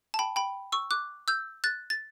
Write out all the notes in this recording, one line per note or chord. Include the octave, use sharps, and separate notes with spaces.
A5
G5 B5
G5 B5
C#6 E6
D6 F#6
E6 G6
F#6 A6
A6